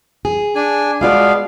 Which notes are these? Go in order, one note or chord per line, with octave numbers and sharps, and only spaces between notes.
G#4
D4 G#5
B2 G#3 B3 F4 D5 F5